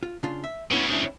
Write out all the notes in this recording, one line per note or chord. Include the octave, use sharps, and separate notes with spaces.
F4
C#3 D4 F4
E5
D2 C#3 B3 C#4 E4
C4 D4 E4